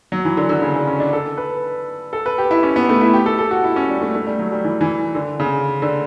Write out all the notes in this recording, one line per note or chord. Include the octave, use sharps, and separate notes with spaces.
F#3
E3
D3
D3
C#3
D3
C#4
D4
A4
B4
A4
B4
G4
E4
C#4
B3
A3
E4
G4
A4
A4
F#4
E4
C#4
G3
A3
A3
G3
F#3
G3
E3
E3
D3
C#3
D3